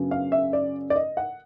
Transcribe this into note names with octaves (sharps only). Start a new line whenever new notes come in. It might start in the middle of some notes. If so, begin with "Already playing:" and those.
Already playing: F#2 C#3 F#3 B3 D4
F5
E5
D5
D5
D#5
F#5